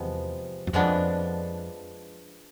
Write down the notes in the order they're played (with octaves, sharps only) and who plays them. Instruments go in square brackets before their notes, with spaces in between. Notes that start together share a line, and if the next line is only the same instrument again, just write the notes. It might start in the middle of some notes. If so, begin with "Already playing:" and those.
Already playing: [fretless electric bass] E2 [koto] C3 F3 G#3 B3
[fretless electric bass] F#2
[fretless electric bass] F2 [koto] F3 G#3 B3 D4